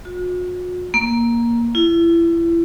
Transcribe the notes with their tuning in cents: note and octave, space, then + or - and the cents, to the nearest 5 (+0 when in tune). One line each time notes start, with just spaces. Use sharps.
F#4 -45
A#3 +10
E4 +30